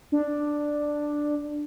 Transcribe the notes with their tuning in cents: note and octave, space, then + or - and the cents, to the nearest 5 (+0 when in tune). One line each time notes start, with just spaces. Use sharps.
D4 +5